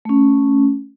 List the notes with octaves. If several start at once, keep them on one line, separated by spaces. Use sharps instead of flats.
A3 C#4